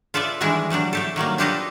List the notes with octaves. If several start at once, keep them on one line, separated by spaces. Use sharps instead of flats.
F4 A4 B4 D5 E5
D#3 E3 G3 G#3 D4 E4
D3 F#3 G3 D4
A3 G4 A4
D#3 F#3 G3 A#3
D4 F4 G4 A4 B4 D#5